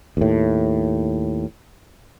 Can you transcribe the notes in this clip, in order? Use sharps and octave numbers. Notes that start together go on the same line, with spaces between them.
D#2 A2